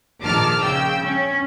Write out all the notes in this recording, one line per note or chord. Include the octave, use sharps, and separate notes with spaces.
A#1 D#3 A5 D6 F6
C#3 G5 E6
C#4